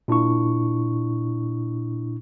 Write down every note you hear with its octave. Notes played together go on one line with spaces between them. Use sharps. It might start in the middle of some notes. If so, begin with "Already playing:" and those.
A#2 D4 E4 C#6